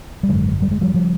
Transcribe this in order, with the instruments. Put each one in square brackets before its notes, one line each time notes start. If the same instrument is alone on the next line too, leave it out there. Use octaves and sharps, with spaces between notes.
[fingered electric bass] G3
G#1 F#2 D3 F#3 G#3
G3
G#3
F3 G3
C#3 F3 G3